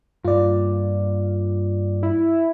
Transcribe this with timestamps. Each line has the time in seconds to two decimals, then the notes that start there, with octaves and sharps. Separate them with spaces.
0.25 G2 A#3 F4 D5
2.03 E4